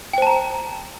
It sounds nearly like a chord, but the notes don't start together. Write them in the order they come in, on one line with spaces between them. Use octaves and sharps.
G5 C5 A5 A#5